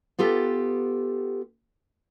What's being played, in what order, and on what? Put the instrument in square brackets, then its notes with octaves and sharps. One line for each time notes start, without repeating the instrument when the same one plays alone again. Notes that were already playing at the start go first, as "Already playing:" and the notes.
[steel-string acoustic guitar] B3 F4 G4 A4